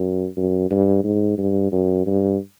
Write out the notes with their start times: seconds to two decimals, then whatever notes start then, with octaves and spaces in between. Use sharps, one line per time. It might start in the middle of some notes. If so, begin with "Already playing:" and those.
Already playing: F#2
0.37 F#2
0.70 G2
1.04 G#2
1.38 G2
1.72 F#2
2.06 G2